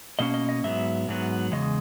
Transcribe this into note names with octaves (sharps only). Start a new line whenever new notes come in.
B2 A#3 C#4 D#5
D#5
D#5
G#2 F#3 B3 E5
G#2 F#3 B3
E2 C#3 G#3 D#5